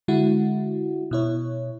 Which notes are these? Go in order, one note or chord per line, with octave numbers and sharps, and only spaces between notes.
D3 G#3 E4 F#4
B2 E4 C#5